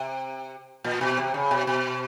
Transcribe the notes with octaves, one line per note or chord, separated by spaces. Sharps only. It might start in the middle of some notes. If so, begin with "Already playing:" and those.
Already playing: C3
A#2
B2
C3
C#3
B2
B2